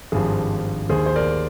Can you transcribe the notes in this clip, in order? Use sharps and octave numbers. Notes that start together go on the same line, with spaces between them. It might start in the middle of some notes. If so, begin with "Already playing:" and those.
G#1 G2 F3 G#4
D#2 D#3 G#4 C5
C5
A#4 D5